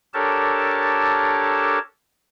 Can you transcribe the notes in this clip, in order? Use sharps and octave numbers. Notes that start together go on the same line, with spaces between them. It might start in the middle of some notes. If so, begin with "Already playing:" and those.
D4 G4 A4 A#4 C#5 A5